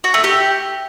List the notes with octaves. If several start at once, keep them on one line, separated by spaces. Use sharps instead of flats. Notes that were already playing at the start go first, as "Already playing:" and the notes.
F#4
A3
G4